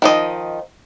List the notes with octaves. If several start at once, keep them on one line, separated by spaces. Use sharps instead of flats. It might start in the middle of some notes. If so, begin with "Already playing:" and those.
D#3 F3 D#5